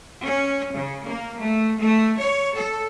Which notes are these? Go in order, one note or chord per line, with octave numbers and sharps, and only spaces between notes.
C#4
C#3
A#3
A3
A3
C#5
A4